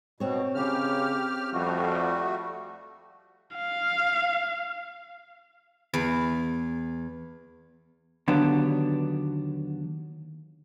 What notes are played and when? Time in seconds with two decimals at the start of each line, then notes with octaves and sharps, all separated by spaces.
0.20 B2 C4 C#5
0.55 C#3 G4 F6
1.52 F2 G3 A3 F#4
3.56 F5
5.94 E2
8.28 D#2 D3 F#3 B3 D4